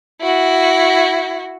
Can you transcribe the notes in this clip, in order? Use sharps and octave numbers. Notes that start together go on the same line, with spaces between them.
E4 F#4